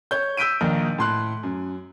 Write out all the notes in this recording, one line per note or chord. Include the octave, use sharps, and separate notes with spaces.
C#5 G6
E6 G6 B6 D7 D#7
A#1 A#2 D#3 D#4
A2 C6 F#6
F#2